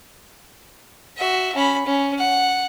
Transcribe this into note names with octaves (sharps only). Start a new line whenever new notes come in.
F#4 E5
C#4 B5
C#4
F#5